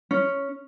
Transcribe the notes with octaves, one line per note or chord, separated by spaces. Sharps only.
C#4